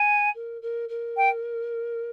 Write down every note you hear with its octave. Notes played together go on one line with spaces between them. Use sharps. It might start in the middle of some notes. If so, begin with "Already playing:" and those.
Already playing: G#5
A#4
A#4
A#4
G5